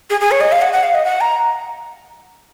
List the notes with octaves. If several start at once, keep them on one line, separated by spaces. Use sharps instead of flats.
G#4
G#4
C#5
D#5
F5
F#5
F#5
F5
D#5
F#5
A#5